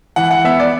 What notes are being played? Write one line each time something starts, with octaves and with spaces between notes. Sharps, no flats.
E3 F#5
F#5
B3 E5
D5